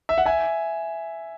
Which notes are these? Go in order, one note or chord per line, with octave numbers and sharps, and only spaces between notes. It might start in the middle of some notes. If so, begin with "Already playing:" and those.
E5
F#5
E5 G#5